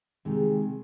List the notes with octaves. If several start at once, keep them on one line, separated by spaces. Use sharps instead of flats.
C3 D#3 G#3